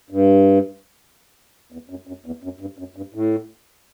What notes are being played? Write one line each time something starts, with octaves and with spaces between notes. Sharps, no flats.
G2
E2
F#2
F#2
E2
F#2
G2
F#2
G2
A2